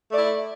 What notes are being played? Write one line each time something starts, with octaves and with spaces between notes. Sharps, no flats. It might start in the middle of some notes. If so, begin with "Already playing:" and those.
A3 E4 D5